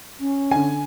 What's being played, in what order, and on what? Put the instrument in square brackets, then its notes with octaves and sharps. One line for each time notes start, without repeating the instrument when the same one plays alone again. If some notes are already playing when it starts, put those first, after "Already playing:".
[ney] C#4
[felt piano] D3 G#5